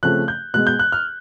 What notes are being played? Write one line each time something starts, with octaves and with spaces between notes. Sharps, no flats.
C#3 F3 A3 C4 F#6
G6
B2 G#3 B3 F#6
G6
F#6
F6